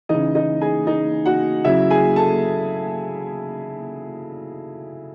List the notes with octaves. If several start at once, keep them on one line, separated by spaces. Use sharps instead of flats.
C#3 E3 D#4 D#5
D#4 D#5
G#4 G#5
D#4 D#5
F#4 F#5
C#3 F#3 E4 E5
G#4 G#5
A4 A5